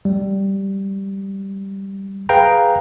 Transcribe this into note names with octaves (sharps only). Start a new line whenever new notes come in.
G3
G#4 B4 F5 G5 A#5